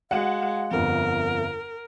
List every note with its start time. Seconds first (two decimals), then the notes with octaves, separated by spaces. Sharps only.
0.11 G#3 F#4 F5 F#5
0.71 G1 F2 A#4